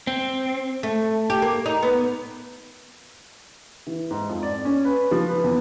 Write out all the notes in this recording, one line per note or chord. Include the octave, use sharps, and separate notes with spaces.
C4
A3
G4
A#3
D#4
B3
E3
G#2
F2
D5
C#4
B4
F3
B4
E2